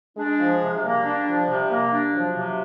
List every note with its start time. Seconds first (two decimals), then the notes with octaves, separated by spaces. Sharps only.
0.17 G#3 D4
0.39 F3
0.61 C3
0.83 G3 A#3
1.04 D4
1.27 F3
1.48 C3
1.70 A#3
1.92 D4
2.14 F3 F#3
2.36 C3